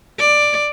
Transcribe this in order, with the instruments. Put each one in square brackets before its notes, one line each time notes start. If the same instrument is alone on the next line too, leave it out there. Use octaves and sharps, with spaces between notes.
[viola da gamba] D5